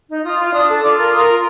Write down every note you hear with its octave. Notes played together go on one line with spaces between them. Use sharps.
D#4
F4 D#6
F4
D4 D#6
A4
F4 D6
A#4
A#4 D#6
F4